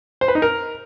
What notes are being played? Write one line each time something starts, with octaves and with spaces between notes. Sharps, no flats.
C5
B4
D#4
A#4